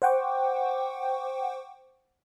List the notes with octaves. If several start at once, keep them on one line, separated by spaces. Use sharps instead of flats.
C5 F#5 G5 C#6 D6